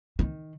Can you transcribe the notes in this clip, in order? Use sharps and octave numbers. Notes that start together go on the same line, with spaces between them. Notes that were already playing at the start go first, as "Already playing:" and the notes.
D#3